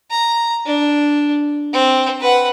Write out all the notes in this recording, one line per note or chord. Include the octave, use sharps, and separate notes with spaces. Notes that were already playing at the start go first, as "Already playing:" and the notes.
A#5
D4
C4
B4 F#5